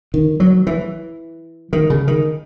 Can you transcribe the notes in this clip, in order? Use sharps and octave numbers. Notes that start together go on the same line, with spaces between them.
D#3
F#3
E3
D#3
C#3
D#3